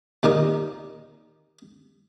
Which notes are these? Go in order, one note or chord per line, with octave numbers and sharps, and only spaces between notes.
D#2 A#2 D#4 G4 A#4 D#6